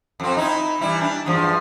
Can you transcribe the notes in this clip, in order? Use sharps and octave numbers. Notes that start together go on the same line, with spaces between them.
F2 C4
D#4 E4
E3 G3 E4
D4
E2 G2 F3